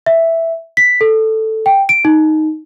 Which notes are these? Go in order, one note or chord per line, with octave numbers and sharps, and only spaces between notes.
E5
B6
A4
G5
D7
D#4